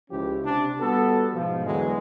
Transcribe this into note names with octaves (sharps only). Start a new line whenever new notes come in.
C#2 F3 C#4 E4 G4
C3 D4
G3 B3 F#4 A4
G#2 B2 F3
E2 D3 E3 F#3 G#3